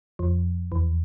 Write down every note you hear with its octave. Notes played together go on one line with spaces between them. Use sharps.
F2 F3
E2 E3